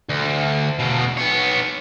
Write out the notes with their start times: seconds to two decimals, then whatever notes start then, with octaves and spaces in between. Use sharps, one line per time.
0.09 D2
0.79 E2 B2
1.17 B3 C#5